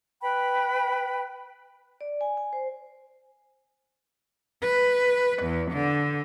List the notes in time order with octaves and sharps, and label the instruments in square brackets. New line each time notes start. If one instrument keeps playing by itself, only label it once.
[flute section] B4 G5 B5
[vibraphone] D5
G#5
G#5
C5
[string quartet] B4
E2
D3